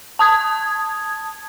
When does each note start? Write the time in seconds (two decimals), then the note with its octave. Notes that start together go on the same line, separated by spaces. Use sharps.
0.19 A5 D#6 G#6